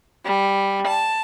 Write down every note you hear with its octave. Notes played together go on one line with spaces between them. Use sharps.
G3
A5